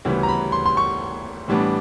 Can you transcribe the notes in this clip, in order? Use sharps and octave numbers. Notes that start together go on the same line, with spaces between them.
D2 C#3 E3 G3 B3
A#5
B5
C6
C6
C#6
A2 E3 G3 B3 D4